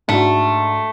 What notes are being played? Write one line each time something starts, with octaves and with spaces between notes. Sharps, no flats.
G#2 G#3 A3 D4 F#4